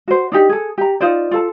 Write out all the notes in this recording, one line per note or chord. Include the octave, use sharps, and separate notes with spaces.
F#4 C5
D4 D#4 G4
G#4 A4
G4 A#5
D#4 F4 C5 D5
F4 A4 A5